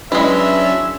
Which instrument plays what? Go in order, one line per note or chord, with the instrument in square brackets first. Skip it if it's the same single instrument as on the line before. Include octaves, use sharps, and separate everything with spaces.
[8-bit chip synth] F#3 C#4 D4 [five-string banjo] G#3 E4 [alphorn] B4 [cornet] E5